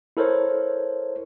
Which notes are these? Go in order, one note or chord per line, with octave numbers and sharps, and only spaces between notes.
E4 A4 A#4 C5 C#5